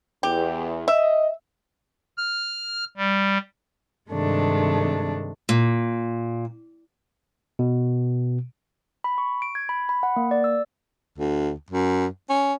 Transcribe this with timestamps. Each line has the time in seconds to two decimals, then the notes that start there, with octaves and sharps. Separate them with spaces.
0.23 E2 G4
0.88 D#5 E5
2.17 F6
2.97 G3
4.12 G2 C3 D#3 G#3 A3 D4
5.49 A#2
7.59 B2
9.04 B5
9.18 C#6
9.42 D7
9.55 G#6
9.69 B5
9.89 B5
10.03 F#5
10.16 A#3
10.31 D5
10.44 E6
11.18 D2
11.70 F#2
12.30 C#4